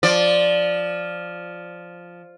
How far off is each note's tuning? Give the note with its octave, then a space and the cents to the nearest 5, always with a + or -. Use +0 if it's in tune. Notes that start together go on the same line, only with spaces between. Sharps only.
F3 +0 D5 +0